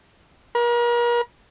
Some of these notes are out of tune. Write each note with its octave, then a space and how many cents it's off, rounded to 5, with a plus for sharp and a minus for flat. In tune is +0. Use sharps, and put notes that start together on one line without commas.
A#4 +40